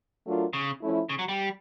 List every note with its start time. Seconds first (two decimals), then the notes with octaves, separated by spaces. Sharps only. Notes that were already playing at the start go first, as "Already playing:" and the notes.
0.25 F#3 A3 D4 F4 A#4
0.53 C#3
0.82 F3 A3 C#4 E4
1.09 C#3
1.19 F#3
1.28 G3